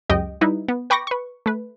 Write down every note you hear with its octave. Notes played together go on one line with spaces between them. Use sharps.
C#2 F#2 G#3 G4 D#5 G5
G3 D#4 E4 B4
B3
B4 G5 B5 C#6 D6 A#6
B4 C#6
A3 B4